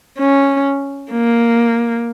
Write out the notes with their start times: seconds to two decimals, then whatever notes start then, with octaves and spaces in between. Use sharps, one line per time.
0.19 C#4
1.12 A#3